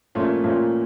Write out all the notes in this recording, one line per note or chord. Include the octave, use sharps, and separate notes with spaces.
A#2 F3 A3 C#4 F4
A#2 F3 A3 C#4 F4